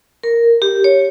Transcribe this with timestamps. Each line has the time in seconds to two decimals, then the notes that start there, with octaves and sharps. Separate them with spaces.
0.23 A#4
0.62 G4
0.84 C#5